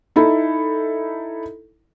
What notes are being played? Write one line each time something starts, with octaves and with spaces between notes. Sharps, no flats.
D#4 E4 A4